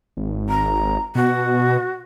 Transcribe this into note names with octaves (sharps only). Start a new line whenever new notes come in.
G#1
A#5
B2 F#4